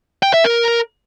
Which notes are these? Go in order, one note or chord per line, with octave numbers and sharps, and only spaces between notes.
G5
E5
A#4